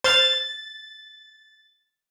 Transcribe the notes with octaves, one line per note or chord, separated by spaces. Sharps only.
C5 C6 F6 A6